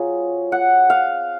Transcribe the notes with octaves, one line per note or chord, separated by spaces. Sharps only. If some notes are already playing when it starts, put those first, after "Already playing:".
Already playing: F#3 C4 F4 G#4
F#5
F5